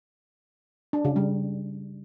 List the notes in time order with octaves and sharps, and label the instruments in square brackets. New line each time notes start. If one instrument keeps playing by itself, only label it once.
[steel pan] D4
C#3
G3